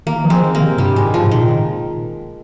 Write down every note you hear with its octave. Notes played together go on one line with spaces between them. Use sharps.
D#3 A#3
F3
G#3 C4
D#3
A#3
C3
G2 G3
G#2 G#3
F3
C3
A#2 D#3